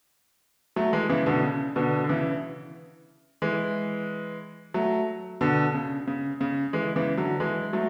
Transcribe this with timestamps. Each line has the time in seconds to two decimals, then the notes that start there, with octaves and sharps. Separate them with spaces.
0.76 F#3 A3
0.93 E3 G#3
1.09 C#3 E3
1.26 B2 D3
1.43 C#3
1.76 B2 D3
2.04 D3
2.09 C#3 E3
3.42 E3 G#3
4.74 F#3 A3
5.41 B2 D3
5.74 C#3
6.07 C#3
6.41 C#3
6.73 E3 G#3
6.96 C#3 E3
7.17 D3 F#3
7.40 E3 G#3
7.73 F#3 A3